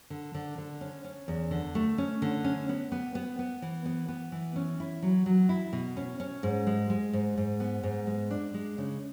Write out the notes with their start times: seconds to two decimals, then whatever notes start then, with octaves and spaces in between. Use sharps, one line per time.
0.10 D3
0.34 D3
0.58 D3
0.81 C#4
1.04 C#4
1.28 E2
1.51 D3
1.75 A3
1.98 C#4
2.22 D3
2.44 C#4
2.69 B3
2.92 B3
3.15 B3
3.39 B3
3.62 E3
3.86 B3
4.08 B3
4.32 E3
4.56 C#4
4.80 E4
5.02 F#3
5.26 F#3
5.49 E4
5.73 B2
5.97 C#4
6.20 C#4
6.43 G#2
6.67 G#3
6.90 G#3
7.13 G#2
7.37 G#2
7.60 B3
7.83 G#2
8.07 G#3
8.30 D4
8.54 G#3
8.78 C#3